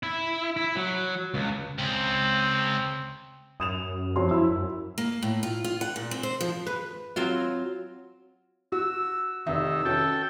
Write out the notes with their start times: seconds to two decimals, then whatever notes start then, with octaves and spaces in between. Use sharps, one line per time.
0.03 E4
0.57 E4
0.76 F#3
1.34 C#2
1.79 C#2 C4
3.60 F#2 D#6 E7 F7
4.16 F2 F#3 C6
4.31 E4 E6
4.50 F#2
4.98 A#3
5.23 A2
5.43 F4
5.64 F4
5.81 F#5
5.96 A#2
6.11 C4
6.23 C5
6.41 F3
6.67 B4
7.16 F#3 C4 F4
8.72 F#4 E6
9.46 F1 D#3 E5 E6
9.85 C#4 F#4 A4 G5